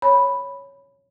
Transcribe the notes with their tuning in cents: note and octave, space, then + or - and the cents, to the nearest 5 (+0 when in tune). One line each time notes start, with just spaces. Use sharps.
C#5 +0 G#5 +20 B5 +0